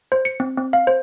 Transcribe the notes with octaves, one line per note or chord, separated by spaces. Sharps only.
C5
C#7
C4
C4
F5
C5